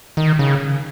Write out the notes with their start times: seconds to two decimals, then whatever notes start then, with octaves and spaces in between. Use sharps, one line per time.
0.17 D#3
0.39 C#3